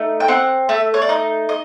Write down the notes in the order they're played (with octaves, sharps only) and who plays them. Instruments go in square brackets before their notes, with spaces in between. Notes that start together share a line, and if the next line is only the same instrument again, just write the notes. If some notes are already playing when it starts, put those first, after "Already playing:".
Already playing: [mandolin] A3 D#4
G5
C4 F#5
A3 E5
C#5
D5
D#4 D#5
D#5